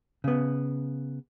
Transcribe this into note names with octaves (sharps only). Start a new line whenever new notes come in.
C#3 B3